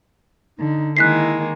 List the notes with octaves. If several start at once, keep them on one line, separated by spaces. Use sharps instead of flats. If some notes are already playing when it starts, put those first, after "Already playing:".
D3 D#4
D#3 G#3 A#3 E4 F#6 B6 C7